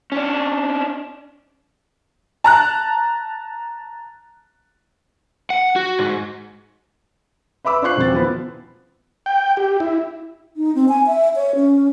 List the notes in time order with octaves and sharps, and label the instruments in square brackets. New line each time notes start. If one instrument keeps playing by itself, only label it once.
[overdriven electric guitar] C#4 D4
[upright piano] A5 A#5 F#6
[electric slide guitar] F#5
F#4
G#2
[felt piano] B4 E5 B5 D6 E6
D4 F4 C5 C#6 F#6 C7
E1 F3 C4 A6
F3 B3 E4
[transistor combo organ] G5
G4
E4
[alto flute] D#4
C4
G#5
E5
C#5
C#4